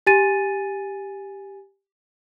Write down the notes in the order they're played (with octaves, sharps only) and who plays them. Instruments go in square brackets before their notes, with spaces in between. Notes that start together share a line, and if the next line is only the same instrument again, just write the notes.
[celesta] G4 G#5 A6 D#7